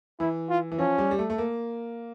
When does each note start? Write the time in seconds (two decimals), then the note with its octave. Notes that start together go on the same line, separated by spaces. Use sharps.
0.20 E3 E4
0.50 F4
0.72 E3
0.79 F3 C#4
0.98 G3
1.11 G3
1.19 A3
1.30 A3
1.38 A#3